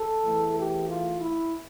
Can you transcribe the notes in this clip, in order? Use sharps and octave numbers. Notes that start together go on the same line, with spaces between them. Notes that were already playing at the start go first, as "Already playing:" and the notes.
Already playing: A4
E2 E3 A3
G4
F4
E4